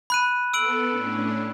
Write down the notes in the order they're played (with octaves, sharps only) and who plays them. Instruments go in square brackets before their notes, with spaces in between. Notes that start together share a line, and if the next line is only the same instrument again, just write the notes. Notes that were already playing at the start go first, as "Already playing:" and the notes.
[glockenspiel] B5 F#6 D#7
[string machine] B3 A4 [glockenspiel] E6 D7 F#7
[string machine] A2 C#4 D4